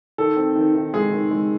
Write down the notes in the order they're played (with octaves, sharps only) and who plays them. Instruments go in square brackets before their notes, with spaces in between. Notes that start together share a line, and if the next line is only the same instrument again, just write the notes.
[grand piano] D#3 A4
C4
D#3
D#3
G#3 G#4
D#3
G#3